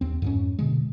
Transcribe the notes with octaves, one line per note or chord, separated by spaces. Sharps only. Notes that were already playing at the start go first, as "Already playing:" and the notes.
D#2 C4
F2 G#2 C#4
B2 D3 G#3